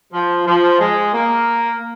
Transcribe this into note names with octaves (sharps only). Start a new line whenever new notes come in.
F3
F3
G#3
A#3